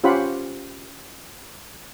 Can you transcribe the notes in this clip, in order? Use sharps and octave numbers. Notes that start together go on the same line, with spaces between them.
C#4 F4 G4 C5 F#5 B5